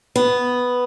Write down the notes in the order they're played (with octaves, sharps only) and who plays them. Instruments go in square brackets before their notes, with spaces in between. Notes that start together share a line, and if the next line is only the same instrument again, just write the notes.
[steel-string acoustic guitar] B3